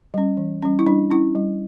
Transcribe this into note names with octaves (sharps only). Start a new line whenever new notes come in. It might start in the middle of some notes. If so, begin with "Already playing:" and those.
G3 C#4
E3
G3 C#4
E4
G3 D4
C#4 E4
G3